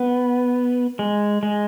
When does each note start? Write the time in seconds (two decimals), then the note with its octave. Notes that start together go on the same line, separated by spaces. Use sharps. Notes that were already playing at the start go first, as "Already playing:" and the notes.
Already playing: B3
0.99 G#3
1.43 G#3